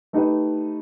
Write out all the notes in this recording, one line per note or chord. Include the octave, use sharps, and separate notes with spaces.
A3 D#4 G4 B4